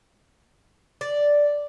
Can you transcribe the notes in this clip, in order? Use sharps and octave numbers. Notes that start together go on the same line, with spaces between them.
D5